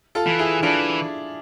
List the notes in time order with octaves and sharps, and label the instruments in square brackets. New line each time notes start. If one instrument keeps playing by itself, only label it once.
[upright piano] F4 A4
[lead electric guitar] E3
[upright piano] E4 G#4
[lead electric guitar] E3 [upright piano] D4 F4